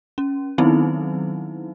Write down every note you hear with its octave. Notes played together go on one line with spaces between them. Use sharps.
C#4
D#3 F#3 B3 C4 D#4 E4